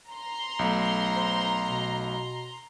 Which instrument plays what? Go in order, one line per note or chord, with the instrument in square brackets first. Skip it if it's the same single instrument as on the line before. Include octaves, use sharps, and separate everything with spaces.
[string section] A#5 C6
[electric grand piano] B1 A3
[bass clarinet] C5
B2